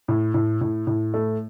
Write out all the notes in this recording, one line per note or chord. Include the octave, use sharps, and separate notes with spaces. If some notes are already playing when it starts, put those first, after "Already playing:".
A2
A2
A2
A2
A3